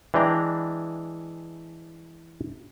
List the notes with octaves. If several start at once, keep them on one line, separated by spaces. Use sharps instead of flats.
E3 G#3 D4 D5 G5 A#5